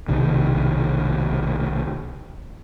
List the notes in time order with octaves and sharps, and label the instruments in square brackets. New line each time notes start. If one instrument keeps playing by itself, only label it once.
[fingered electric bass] B1 C3 D#3